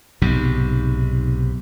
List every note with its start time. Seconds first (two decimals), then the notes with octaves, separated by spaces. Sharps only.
0.22 B1 G#2 C3